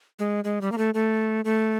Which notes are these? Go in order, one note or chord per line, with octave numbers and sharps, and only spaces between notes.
G#3
G#3
G3
A#3
A3
A3
A3